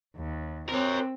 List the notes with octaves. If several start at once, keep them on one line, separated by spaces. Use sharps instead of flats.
D#2
C4 A#4 C#5